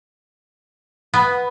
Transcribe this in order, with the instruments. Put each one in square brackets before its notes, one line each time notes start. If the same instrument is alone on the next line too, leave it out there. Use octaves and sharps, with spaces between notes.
[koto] B3